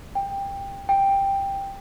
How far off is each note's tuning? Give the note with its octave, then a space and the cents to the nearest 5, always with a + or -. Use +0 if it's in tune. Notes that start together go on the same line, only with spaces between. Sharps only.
G5 +15
G5 +10